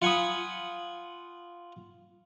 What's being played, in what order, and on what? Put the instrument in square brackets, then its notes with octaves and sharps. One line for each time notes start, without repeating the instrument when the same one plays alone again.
[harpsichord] F4 F#5 G#5 B5 D#6